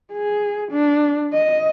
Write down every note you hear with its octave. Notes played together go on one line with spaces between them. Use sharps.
G#4
D4
D#5